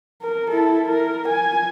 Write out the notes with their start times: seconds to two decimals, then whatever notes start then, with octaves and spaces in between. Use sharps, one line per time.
0.22 A#4
0.51 E4 A4
0.87 A#4
1.28 G#5